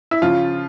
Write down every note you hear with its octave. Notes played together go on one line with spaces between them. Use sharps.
E4
C#3 F3 F4